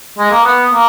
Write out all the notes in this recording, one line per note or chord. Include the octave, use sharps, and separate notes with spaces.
G#3
A#3
B3
A#3